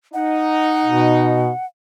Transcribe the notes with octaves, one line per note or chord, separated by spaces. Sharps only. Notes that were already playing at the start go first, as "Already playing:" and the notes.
D#4 F#5
B2